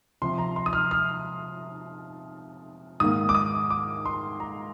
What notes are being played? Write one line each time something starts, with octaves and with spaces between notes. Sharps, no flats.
C3 F3 C4 C6
A#5
C6
D#6
F6
F6
G#2 D#3 A#3 D#6
D6
D#6
D6
C6
A#5